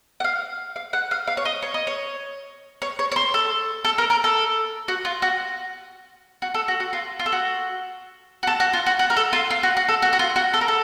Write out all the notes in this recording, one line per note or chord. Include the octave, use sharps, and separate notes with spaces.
F#5
F5
F5
F#5
F5
F5
C#5
D#5
C#5
D#5
C#5
C#5
C#5
C#5
C5
A4
A4
A#4
A#4
A4
F#4
F4
F#4
F#4
A4
F#4
F#4
F4
F4
A4
F#4
F#4
A4
F#4
F4
F#4
F#4
A#4
A4
F4
F4
F#4
F#4
A4
F#4
F#4
F4
F#4
A4
A#4
A4